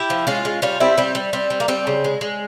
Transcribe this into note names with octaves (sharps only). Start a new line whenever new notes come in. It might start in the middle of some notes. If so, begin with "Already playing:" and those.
Already playing: E4 G4
F3
G#3 C#4 F4
G#3
G3 C#4 F4
G3 C4 E4
G3 C4
G3
G3 C4
G3
A#3
G3 C4
C#3
G#3
G#3